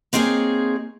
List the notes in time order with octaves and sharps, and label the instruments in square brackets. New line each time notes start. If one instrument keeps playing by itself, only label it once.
[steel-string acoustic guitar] A#3 C4 D#4 G#4 C#5